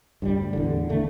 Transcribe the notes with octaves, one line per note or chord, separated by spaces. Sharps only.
G2 F#3 G3
D2
E2 A2 D3
G#1 D3 A3